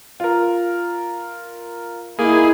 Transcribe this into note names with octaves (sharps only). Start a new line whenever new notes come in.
F4 A#4
A#3 D#4 E4 G#4